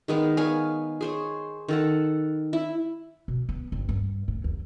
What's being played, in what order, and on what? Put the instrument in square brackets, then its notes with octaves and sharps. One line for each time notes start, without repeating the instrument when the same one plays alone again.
[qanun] D#3 G#3 B3 D#4
B3 C#5 F5 G#5
G#4 C5 C#5
D#3 A4 F#5
E4
[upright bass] B2
B3
G1
G2
A2
D#2